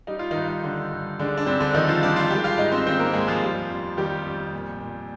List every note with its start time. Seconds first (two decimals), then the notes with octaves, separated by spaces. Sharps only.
0.07 G3 D#4
0.19 F4
0.31 G2 D#3 D#4
0.64 D3
0.92 G2
1.19 D3 G#3 D4
1.38 D4
1.46 G2 C4
1.61 D3 D4
1.74 D#3 F3 D#4
1.88 F3 F4
2.03 G2 D4 D5
2.16 F4 F5
2.30 G#3 G4 G5
2.44 F4 F5
2.58 G#2 D#4 D#5
2.72 C4 C5
2.85 D#3 C4 C5
3.00 A#3 A#4
3.13 G#2 G#3 G#4
3.28 F3 F4
3.42 G3
3.69 F2
3.97 D#3 G3 G4
4.25 F2
4.53 A#2
4.81 A#2